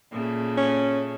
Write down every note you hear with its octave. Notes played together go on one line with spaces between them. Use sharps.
A#2 C#3 A3
C#4